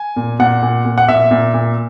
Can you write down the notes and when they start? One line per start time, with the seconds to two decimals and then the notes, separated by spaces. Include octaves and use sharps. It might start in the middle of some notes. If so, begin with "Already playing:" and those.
Already playing: G#5
0.16 A#2
0.39 A#2 F#5
0.62 A#2
0.85 A#2
0.98 F#5
1.08 A#2 E5
1.31 A#2
1.54 A#2